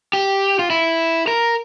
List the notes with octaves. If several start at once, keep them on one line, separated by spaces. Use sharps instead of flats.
G4
F4
E4
A#4